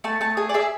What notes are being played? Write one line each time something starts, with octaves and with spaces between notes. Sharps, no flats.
A3 A5
A3 A5
G#4 G#5
D5
G#4 E5